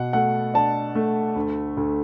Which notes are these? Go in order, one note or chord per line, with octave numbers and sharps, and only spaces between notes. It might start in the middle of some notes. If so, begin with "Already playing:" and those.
Already playing: B2 F#5
A3 F#5
D4 A5
A3
D2
D2